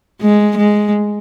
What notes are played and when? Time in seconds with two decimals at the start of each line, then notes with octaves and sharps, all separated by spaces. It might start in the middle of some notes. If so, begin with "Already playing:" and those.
0.21 G#3
0.57 G#3